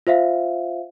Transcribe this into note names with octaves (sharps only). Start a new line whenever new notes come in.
F4 C5 E5 F5